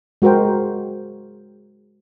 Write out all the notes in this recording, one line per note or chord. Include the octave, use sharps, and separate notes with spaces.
G#3 F#4 A#4 C5 G5